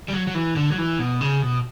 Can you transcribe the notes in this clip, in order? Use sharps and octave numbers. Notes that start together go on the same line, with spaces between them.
G3
F#3
F#3
E3
D3
F#3
E3
B2
C#3
B2